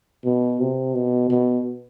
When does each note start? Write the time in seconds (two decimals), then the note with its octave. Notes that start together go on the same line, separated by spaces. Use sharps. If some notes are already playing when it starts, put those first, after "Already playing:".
0.25 B2
0.60 C3
0.94 B2
1.30 B2